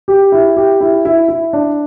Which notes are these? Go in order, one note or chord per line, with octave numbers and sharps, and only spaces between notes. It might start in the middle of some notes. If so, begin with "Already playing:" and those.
G4
E4
G4
E4
E4
E4
D4